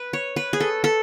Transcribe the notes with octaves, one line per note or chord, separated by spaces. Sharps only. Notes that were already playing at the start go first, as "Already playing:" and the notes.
Already playing: B4
C#5
B4
G#4
A4
A4